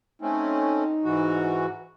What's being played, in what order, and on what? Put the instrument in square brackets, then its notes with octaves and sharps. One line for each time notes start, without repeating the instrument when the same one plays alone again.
[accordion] A3 C4 C#4 [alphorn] D#4
[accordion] G#2 E3 F#4